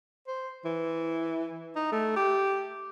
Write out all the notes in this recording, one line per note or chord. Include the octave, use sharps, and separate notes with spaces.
C5
E3
D#4
A3
G4